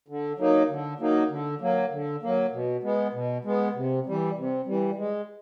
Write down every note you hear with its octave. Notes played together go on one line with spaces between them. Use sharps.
D3
F#3 A#3 D#4
D3
F#3 A#3 D#4
D3
F#3 A#3
D3
F#3 A#3
B2
G#3 B3
B2
G#3 B3
C3
E3 G3
C3
E3 G3
G#3